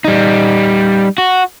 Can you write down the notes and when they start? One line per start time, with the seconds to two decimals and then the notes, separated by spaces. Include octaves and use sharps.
0.04 G3 D#4
1.18 F#4